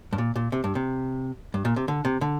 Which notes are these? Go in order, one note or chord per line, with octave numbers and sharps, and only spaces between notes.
G2
A#2
A#2
C3
G2
C3
G2
A#2
C3
D3
C3
D3